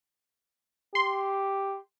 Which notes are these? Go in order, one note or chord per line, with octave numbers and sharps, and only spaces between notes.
G4 C6